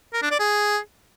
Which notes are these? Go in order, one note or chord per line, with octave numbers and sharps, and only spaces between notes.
A#4
D4
D5
G#4